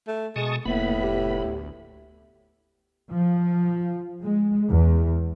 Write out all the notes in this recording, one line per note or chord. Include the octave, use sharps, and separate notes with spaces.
A3
B2 G#3 A5 C#6 D#6
F1 A2 A#3 B3 B5
G4
D2
F3
G#3
E2